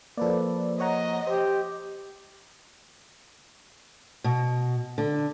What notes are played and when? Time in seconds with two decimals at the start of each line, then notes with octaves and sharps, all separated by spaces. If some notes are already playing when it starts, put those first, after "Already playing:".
0.17 F3 A#3 A4 B4 D5
0.80 C#5 D#5 F#5 A#5
1.27 G4 C5
4.24 B2
4.98 D3